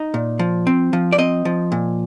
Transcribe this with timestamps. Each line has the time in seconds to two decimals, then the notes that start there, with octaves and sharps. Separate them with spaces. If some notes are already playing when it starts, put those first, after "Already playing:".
Already playing: D#4
0.14 A#2
0.39 F3
0.67 C4
0.93 F3
1.12 D5
1.18 C4 D#5
1.45 F3
1.72 A#2